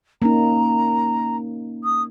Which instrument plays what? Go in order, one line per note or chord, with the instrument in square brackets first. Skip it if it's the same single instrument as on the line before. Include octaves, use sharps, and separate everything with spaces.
[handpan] A#3 C#4 D#4 [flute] A#5
[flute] D#6